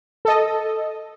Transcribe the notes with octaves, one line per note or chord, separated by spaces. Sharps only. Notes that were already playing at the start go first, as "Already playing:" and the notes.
A4 D#5